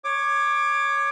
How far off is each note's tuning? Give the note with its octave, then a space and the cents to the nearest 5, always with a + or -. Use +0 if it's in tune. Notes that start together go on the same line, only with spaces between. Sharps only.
C#5 +0 D6 +20